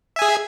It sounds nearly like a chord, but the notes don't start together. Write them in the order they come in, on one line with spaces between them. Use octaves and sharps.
E5 G#5 G#4